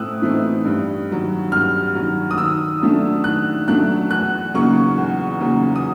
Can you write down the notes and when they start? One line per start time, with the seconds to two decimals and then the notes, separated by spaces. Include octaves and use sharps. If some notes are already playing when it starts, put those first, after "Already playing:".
Already playing: A2 A3 C4 D#6 E6 F#6
0.22 E3 A3 C4 D#4
0.65 G2
1.09 D#3 F#3
1.52 G2 F6
1.95 D#3 F#3
2.31 D#6
2.38 D#3 E6
2.81 F#3 A3 D4
3.24 D#3 F#6
3.68 F#3 A3 D4 F#6
4.11 E2 F#6
4.54 C#3 F#3 A#3 D#4 C#6
4.98 E2
5.40 C#3 F#3 A#3 D#4
5.76 D#6